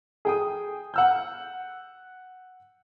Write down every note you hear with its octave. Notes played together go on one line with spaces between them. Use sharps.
G#4 G5 D#6
F#5 E6 G6